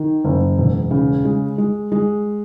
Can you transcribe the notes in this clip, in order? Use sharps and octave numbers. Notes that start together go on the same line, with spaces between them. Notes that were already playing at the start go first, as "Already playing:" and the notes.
Already playing: D#3
F#1
E1
C#3
G#3
G#3
G#3